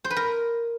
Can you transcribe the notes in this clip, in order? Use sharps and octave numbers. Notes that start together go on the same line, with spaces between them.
C5
B4
A#4